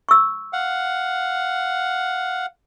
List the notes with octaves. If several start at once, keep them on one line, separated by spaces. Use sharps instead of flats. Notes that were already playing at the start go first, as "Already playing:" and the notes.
C#6 E6
F5 F#5